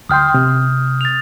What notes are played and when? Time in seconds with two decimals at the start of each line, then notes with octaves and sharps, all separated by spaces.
0.09 D2 G5 C6 D#6 F6 G6
0.34 C3
1.01 A6 F7